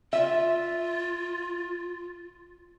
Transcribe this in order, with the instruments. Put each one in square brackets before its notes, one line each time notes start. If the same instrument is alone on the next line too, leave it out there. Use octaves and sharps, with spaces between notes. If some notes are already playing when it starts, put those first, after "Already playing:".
[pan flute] F4 [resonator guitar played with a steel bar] E5